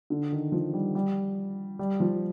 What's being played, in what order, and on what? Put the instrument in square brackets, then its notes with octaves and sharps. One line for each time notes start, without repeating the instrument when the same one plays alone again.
[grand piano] D3
D#3
F3
G3
G3
G3
F3